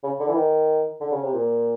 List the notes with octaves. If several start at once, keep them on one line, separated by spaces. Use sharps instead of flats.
C#3
D3
E3
D#3
D3
C#3
C3
A#2